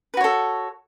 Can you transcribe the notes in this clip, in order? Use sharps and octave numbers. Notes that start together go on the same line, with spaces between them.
F#4 A4 B4 C#5